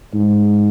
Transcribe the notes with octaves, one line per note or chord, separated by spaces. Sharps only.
G#2